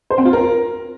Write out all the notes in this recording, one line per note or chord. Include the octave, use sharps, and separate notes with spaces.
C5
C4
F4
A#4